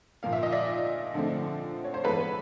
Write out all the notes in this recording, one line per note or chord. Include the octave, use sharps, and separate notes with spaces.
A#2 F3 A#3 F5
E5
D#5
D5 E5
D3 F3 A3 C4
C#5
C5
E3 G#3 B3 A4 B4